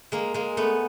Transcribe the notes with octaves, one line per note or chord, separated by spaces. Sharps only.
G#3 A#3
G#3 A#3
A3 B3